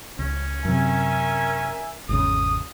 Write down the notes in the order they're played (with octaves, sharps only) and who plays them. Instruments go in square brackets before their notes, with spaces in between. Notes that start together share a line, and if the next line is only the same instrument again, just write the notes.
[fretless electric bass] C#2 [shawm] C#4
[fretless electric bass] F#2 C3 [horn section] A#4 E5 G#5
[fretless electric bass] G#1 E2 C#3 [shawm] D#6